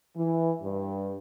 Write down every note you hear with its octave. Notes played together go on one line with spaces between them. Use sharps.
E3
G2